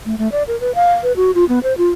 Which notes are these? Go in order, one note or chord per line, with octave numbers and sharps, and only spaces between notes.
A3
A3
D5
A#4
B4
F5
B4
F#4
F4
B3
C5
F4